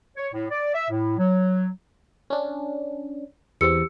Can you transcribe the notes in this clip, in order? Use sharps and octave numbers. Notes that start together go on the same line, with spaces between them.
C#5
A2
D5
E5
A2
F#3
C#4 D4
E2 C4 G4 E6 C#7